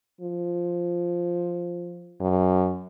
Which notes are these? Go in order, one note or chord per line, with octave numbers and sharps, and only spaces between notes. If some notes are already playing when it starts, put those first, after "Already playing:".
F3
F#2